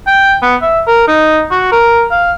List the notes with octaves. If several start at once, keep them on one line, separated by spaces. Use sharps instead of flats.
G5
B3
E5
A#4
D#4
F#4
A#4
F5